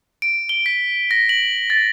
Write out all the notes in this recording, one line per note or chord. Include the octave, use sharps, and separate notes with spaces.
D7
G7
B6
A#6
F#7
A6